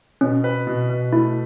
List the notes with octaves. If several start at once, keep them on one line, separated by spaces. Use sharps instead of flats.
B2 C#4
B4
B2
B2
A3 E4